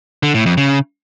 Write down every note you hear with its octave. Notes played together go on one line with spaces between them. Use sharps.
D3
A2
F2
C#3